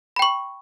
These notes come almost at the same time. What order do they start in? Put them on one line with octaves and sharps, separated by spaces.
B5 G5 C#6